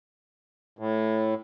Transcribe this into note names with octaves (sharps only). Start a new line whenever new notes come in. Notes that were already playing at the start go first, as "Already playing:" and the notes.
A2